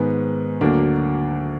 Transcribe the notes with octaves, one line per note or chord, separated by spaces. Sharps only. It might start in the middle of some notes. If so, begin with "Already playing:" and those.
Already playing: G#2 D#3 G#3 B3
D2 D3 F#3 A#3 D4